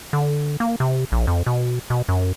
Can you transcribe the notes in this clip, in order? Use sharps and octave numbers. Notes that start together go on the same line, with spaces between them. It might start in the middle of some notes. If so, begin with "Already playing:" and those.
D3
A#3
C3
A#1
F2
B2
B2
F#2